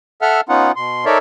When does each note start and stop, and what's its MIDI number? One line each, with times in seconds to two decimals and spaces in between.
0.22 0.41 69
0.22 0.41 76
0.22 0.41 78
0.22 0.41 89
0.49 0.72 59
0.49 0.72 61
0.49 0.72 63
0.49 0.72 65
0.49 0.72 78
0.76 1.05 47
0.76 1.05 84
1.05 1.18 63
1.05 1.18 69
1.05 1.18 70
1.05 1.18 73
1.05 1.18 74
1.05 1.18 76